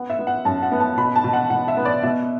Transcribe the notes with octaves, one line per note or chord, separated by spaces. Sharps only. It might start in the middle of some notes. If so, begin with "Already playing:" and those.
Already playing: B3 F#5
E5
B3
F#5
F#2 A5
F#5
B3
A5
B2 B5
A5
B2
F#5
B2 F#5
E5
B3
D5
B2 E5